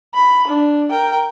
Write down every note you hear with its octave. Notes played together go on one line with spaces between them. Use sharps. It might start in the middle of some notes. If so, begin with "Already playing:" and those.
B5
D4
A#4 G5